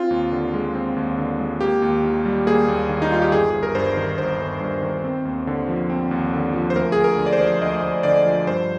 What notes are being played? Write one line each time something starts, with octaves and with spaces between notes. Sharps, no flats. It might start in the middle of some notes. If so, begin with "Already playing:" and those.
Already playing: C4 F4
D#2
D3
G#3
C4
D#2
D3
G#3
A#3 G4
D#2
D#3
G3
A#3 G#4
D#2
D#3
D#4
G3 F4
G4
G1 G#4
G1 G#4
A#4
G2 C5
D#3
G1 C5
G1
G2
D#3
C4
D#2
D3
F3
C4
D#2
D3
F3
C5
D2 A#4
D2 G#4
A#4
D3
D5
C5
F3
D2 D#5
D2
D3 D5
F3
G2 C5